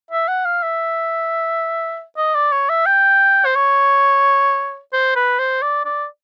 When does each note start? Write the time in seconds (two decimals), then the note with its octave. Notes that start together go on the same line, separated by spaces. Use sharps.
0.11 E5
0.28 F#5
0.45 F5
0.63 E5
2.17 D#5
2.35 D5
2.52 C#5
2.70 E5
2.86 G5
3.45 C5
3.55 C#5
4.93 C5
5.16 B4
5.39 C5
5.62 D5
5.85 D5